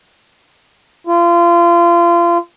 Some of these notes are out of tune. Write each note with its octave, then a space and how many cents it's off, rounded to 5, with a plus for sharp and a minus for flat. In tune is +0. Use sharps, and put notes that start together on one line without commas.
F4 -30